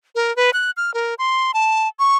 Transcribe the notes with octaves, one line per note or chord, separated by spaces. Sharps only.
A#4
B4
F#6
F6
A#4
C6
A5
C#6